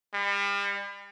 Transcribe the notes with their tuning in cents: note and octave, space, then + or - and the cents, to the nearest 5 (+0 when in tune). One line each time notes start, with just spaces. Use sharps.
G3 +40